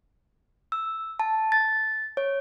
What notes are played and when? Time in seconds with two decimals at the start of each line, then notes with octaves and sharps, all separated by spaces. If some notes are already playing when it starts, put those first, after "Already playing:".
0.72 E6
1.19 A5
1.52 A6
2.17 C#5